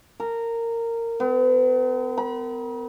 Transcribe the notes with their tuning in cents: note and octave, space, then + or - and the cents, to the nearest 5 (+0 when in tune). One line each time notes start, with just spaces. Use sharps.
A#4 -15
B3 +45
B5 -40